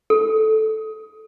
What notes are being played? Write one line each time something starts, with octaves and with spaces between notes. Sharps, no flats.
A4